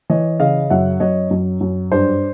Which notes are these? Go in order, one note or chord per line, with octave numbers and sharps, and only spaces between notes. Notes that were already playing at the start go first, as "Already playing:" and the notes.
E3 C#5 D#5
C#3 D#5 F5
F#2 E5 F#5
F#2 C#5 D#5
F#2
F#2
G2 C5 D5